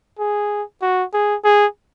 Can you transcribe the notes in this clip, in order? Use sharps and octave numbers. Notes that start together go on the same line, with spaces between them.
G#4
F#4
G#4
G#4